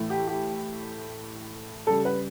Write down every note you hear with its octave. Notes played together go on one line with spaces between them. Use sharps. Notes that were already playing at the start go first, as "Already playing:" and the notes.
Already playing: A2 E3 A3
G4
G4
C#3 G3 A4
B4